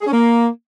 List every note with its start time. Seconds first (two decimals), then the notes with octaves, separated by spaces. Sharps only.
0.01 G#4
0.07 C#4
0.12 A#3